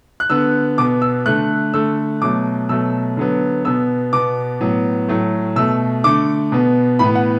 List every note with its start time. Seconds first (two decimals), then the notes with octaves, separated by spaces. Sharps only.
0.20 F#6
0.30 D3 B3 E6
0.78 B2 B3 D6
1.02 E6
1.26 D3 A3 F#6
1.74 D3 A3 E6
2.21 B2 F#3 A3 D6
2.69 B2 F#3 A3 E6
3.17 D3 F#3 B3
3.65 B2 B3 E6
4.13 B2 B3 D6
4.60 A2 F#3 B3
5.08 A2 F#3 A3
5.56 B2 A3 E6
6.04 D3 A3 D6
6.52 B2 B3
6.99 A2 E3 B3 B5
7.15 F#5